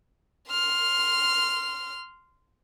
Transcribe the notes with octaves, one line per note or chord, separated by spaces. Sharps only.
C6 F6